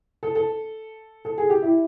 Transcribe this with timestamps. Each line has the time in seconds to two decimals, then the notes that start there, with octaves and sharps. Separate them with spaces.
0.23 A4
0.35 A4
1.25 A4
1.38 G#4
1.50 G4
1.63 E4